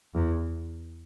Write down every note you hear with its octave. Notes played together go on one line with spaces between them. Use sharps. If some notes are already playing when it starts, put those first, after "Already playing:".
E2